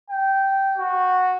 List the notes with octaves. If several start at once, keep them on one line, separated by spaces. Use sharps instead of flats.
G5
F#4